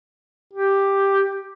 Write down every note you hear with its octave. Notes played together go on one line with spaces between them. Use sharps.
G4